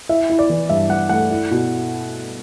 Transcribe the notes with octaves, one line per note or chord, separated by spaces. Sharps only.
E4 E5
E4
D5
E3
G2 E5
G2 F#5
A3 F#5
E4
B2